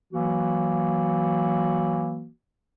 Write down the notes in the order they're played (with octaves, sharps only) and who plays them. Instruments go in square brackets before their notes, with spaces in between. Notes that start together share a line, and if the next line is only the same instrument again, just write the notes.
[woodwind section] E3 F#3 A#3 F#4